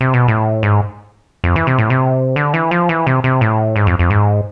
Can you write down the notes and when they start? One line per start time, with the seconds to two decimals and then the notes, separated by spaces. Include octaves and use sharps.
0.01 C3
0.14 B2
0.28 A2
0.63 G#2
1.44 F2
1.56 E3
1.67 C3
1.78 A2
1.90 C3
2.36 D3
2.54 E3
2.71 F3
2.89 E3
3.07 C3
3.24 C3
3.41 A2
3.76 G#2
3.87 F2
3.99 F2
4.10 G#2